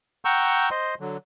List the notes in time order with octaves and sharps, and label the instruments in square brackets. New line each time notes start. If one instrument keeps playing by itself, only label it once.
[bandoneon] F#5 G5 A#5 C#6 E6 G6
C5 D#5 C6
D3 F#3